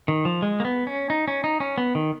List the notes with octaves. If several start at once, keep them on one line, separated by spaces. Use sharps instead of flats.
D#3
F3
G#3
A#3
B3
C#4
D#4
C#4
D#4
C#4
B3
D#3